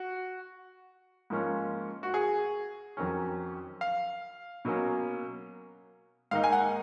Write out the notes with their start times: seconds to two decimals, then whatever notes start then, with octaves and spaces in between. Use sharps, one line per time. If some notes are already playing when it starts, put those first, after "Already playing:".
Already playing: F#4
1.30 G#2 F3 A#3 C#4
2.03 F#4
2.14 G#4
2.97 F2 D#3 F#3 C#4
3.81 F5
4.65 B2 F#3 A#3 C#4
6.31 G#2 D#3 A#3 D#4 F5
6.44 G#5
6.52 F#5